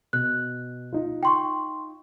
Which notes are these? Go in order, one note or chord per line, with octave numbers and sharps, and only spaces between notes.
B2 F#6
D#4 F4
G5 C6 C#6